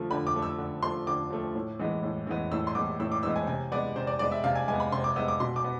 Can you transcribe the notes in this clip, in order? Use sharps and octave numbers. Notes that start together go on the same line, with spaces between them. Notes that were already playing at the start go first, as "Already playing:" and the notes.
Already playing: D3 F3 A3
D3 B5
D6
F3 A3
E6
D3
F3 A3 C6
D3 D6
F3 A3
A2
E3 G#3 B3
A2
E3 G#3 B3
A2 E6
C6
E3 G#3 B3 D6
A2 E6
D6
E3 G#3 B3 E6
G#5
C3 G#5
G#3 B3 D5
C3 C5
D5
G#3 B3 D5
E5
C3 F5
G#5
G#3 B3 G#5
B5
C3 C6
D6
G#3 B3 E6
D6
B2 C6
D6
B3